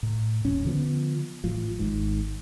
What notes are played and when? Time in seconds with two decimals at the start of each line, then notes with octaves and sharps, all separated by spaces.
0.03 A2
0.45 D#1 F2 C#4
0.66 D3 F3 B3
1.44 A1 A2 F3
1.79 G#1 G#2